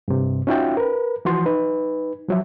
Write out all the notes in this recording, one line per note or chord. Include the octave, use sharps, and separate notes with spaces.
G2 C3
C#4 D#4 F4 F#4 E5 G5
A#4 B4
E3 F3 F#4 C6
D#4 B4
F3 F#3 E5